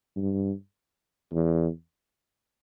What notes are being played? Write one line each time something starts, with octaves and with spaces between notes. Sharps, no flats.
G2
E2